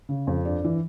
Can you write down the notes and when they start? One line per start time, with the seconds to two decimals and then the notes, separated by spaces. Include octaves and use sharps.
0.09 C#3
0.27 F2
0.45 G2 D5
0.64 E3